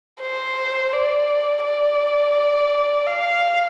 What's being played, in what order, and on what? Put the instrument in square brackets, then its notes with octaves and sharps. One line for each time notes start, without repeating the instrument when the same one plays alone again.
[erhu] C5
D5
D5
F5